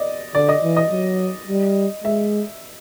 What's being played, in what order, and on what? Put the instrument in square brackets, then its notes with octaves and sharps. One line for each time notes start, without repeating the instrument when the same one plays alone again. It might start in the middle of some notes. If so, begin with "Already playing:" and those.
Already playing: [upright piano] D5 D#5
[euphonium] D3 [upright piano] D5
[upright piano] D#5
[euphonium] E3
[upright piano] D#5
[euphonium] F#3
G3
[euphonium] G#3 [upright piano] E5